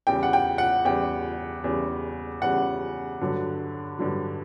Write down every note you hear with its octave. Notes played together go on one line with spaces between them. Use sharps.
E2 C#3 G3 G5
F#5
G5
F#5
E2 C#3 G3 G5
E2 C#3 G3
E2 C#3 G3 F#5
G2 D3 F#3
G2 D3 F#3